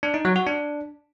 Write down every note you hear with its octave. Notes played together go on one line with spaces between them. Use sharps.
D4
D#4
F#3
F#4
D4